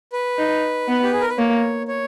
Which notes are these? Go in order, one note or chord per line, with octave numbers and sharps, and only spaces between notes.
B4
D#4
B3
G4
G#4
A#4
B4
A#3 C#5
C#5